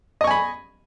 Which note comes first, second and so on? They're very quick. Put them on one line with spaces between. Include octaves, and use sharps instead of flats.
D#5 C#6 G#5 B5